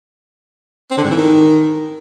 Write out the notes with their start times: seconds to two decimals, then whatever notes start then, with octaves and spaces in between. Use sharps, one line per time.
0.91 C4
0.97 D3
1.04 G#2
1.10 E3
1.17 D#3